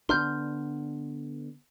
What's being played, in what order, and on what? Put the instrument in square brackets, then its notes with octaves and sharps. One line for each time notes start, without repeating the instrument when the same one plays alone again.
[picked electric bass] D3 B3 D4 [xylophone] C6 F6 G6